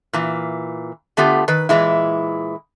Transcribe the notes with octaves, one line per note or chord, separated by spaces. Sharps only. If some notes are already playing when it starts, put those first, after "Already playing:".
A#2 E3
D3 A3 B3 F4 G4
D#3 B4
A#2 E3 G#3 E4